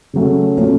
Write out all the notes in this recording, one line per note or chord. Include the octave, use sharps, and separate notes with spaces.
C#3 F#3 A3 C#4
A#2 F#3 A3 C#4